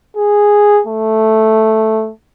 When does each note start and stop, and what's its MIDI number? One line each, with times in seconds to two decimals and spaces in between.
0.17 0.81 68
0.87 2.11 57